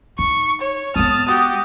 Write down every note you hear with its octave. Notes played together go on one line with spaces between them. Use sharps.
D#4 C#6
C#5
G#3 B3 A5 D#6 F6
F#4 G4